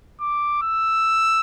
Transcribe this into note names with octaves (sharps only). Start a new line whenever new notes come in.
D6
E6